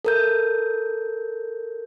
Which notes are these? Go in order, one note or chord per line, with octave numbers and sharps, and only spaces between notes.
A4 A#4 G6